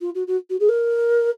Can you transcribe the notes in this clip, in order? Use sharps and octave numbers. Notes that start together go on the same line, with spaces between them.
F4
F#4
F#4
F#4
G#4
A#4